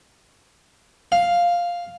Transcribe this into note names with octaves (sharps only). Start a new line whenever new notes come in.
F5